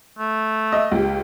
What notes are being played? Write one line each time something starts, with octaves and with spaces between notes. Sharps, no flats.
A3
D#5 E5
C#2 G4